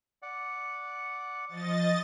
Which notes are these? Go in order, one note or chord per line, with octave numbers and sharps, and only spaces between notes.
D5 F#5
F3 D#5 A6